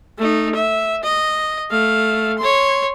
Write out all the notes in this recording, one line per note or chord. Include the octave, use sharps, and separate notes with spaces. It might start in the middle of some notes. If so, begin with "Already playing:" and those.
A3 D#4
E5
D#5
A3 F5
C#5 C6